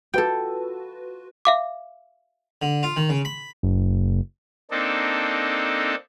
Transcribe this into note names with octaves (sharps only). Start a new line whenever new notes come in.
F4 F#4 A4 B4 G5
E5 F5 D6
D3
F4
D#3
C#3
B5
F#1
A#3 C4 D4 D#4 A4